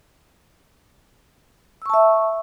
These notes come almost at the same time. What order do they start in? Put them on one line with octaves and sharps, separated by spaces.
E6 C#6 A5 E5